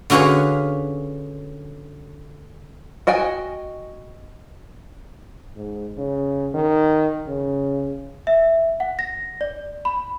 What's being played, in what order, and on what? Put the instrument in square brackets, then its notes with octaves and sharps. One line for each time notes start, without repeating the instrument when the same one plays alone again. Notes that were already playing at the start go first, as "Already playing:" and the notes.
[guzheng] D3 C#4 F#4 G#4 B4 F5
[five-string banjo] F#4 D#5 G5 G#5
[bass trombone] G#2
C#3
D#3
C#3
[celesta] E5
F#5
A#6
D5
B5